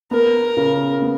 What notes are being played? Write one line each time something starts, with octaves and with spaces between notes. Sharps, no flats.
B3 A#4
C#3
B3